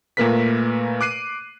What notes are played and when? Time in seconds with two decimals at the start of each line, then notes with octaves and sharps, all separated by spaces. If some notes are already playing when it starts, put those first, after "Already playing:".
0.17 A#2 A3 A#3 A#4 B4 B6
1.01 D6 F#6 C7 D#7